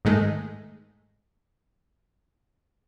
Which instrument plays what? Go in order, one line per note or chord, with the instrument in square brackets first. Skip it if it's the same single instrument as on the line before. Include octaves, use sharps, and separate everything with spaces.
[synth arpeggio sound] G#2 D#3 G#3 A3